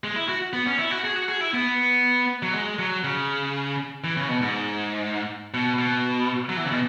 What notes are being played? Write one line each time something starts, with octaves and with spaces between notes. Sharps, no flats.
G#3
E4
F#4
B3
C#4
E4
F#4
G#4
F#4
G#4
E4
B3
F#3
G#3
F#3
C#3
E3
C#3
B2
G#2
B2
B2
F#3
E3
C#3
B2